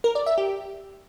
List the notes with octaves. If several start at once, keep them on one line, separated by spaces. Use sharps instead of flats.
A#4
D5
E5
G4